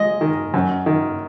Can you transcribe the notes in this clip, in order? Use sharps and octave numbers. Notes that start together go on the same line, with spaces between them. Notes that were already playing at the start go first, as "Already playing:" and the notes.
Already playing: G#3 D#5
D#3
F#2
D#3